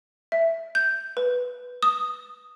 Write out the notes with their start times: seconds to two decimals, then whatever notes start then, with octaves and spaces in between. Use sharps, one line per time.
0.32 E5
0.75 G6
1.17 B4
1.83 D#6